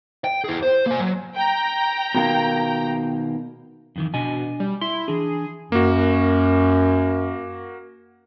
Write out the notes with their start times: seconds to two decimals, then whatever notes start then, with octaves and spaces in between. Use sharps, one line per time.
0.24 G5
0.44 E4 G#4
0.63 C5
0.87 A#3 G#5
0.99 F#3
1.35 G5 A#5
2.15 B2 D#3 A#3
3.96 F2 D#3 E3
4.14 B2 D4 D#5 G#5
4.60 G3
4.81 E4 C6
5.08 E3 D4 G#4
5.72 F#2 A#3 F#4